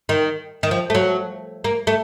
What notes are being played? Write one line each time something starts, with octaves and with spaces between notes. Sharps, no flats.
D#3
D#3
F3
A3
F#3
A#3
A3